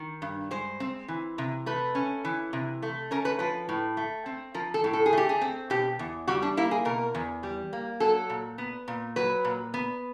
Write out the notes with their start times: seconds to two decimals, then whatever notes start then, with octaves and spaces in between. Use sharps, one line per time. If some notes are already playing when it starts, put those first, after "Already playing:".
Already playing: D#3
0.22 G2
0.51 G#3 C5
0.80 C4
1.08 E3
1.38 C3
1.66 A3 B4
1.95 C#4
2.25 E3
2.53 C3
2.82 A3
3.11 C#4 A#4
3.25 B4
3.39 F3 B4
3.69 A2
3.97 A3
4.26 C4
4.54 F3 A#4
4.74 A4
4.84 A2
4.93 A4
5.06 G#4
5.13 A3 G4
5.29 G#4
5.41 C4
5.70 B2 G4
5.99 E2
6.27 G3 F#4
6.42 D4
6.57 A#3 E4
6.71 G#4
6.85 B2 A#4
7.15 E2
7.43 G3
7.73 A#3
8.00 F#3 A4
8.30 A#2
8.58 B3
8.88 A#2
9.16 F#3 B4
9.45 A#2
9.74 B3